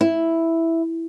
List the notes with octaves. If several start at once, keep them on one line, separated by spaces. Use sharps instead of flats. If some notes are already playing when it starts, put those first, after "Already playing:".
E4